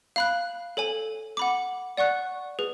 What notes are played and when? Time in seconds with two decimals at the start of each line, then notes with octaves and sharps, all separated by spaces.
0.16 F5 B5 F#6
0.77 A4 C#5 G#5
1.37 F#5 B5 D6
1.97 D5 F#5 C#6 F#6
2.59 G#4 B4